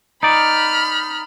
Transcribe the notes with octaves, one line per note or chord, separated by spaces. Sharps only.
D#4 D5 B5 F6